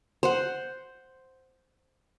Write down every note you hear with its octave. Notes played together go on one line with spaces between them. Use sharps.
C5 F#5